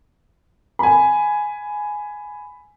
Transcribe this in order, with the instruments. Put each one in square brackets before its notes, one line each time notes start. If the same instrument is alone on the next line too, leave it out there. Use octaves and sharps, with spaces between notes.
[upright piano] G#5 B5